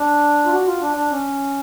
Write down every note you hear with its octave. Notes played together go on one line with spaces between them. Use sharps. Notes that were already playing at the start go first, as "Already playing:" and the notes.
Already playing: D4
F4
F#4
F4
D4
D4
C#4